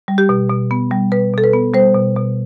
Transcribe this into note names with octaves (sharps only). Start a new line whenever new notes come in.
G3
G4
B2
B2
B3
G3
B2 B4
B2 A4
B4
B3
G3 C5
B2
B2